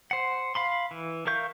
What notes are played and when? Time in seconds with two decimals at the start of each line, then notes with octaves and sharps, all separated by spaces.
0.11 C5 F#5
0.55 F5 B5 C6
0.91 E3
1.27 A#4 E5 F5 C#6 G6